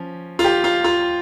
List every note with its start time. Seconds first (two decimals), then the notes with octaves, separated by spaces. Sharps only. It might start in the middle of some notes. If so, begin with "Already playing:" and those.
Already playing: F3 C#4
0.39 F4
0.44 G4
0.64 F4
0.84 F4